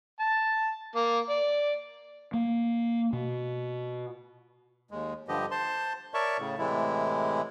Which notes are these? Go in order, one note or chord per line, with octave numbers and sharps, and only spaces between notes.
A5
A#3
D5
A#3
B2
D#2 G#3
G2 D3 F3 G4 D#5
C5 A5 C6
A#4 C#5 D5 E5 A5 C#6
A2 C#3
A2 C3 E3 G#3 E4